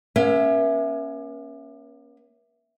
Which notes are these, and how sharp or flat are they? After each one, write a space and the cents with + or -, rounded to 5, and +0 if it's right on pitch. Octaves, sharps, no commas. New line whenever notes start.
A#3 +45 C#4 +0 E5 +0